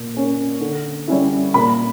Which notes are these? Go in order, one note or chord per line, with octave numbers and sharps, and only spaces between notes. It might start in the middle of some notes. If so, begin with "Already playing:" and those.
Already playing: A#2
A#3 C#4
D3
G3 C#4 E4
A#2 B5